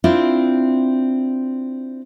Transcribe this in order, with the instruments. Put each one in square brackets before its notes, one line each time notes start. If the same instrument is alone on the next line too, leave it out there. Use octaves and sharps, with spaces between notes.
[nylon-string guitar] C4 D4 E4 F4